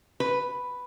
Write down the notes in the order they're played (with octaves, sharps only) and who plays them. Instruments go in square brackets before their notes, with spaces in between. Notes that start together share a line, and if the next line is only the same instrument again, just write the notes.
[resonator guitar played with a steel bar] B4